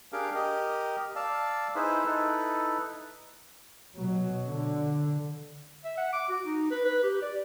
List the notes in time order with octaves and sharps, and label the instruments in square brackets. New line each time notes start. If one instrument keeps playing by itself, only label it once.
[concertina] D4 G4 G#4 A#4 F5 G5
G4 A#4 D#5
D5 F5 A5 E6
D#4 E4 G#4 B4 C5 E5
D#4 E4 A4 B4
[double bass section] B2 F#3
D3
[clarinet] E5
F#5
D6
F#4
D#4
B4
B4
G4
D5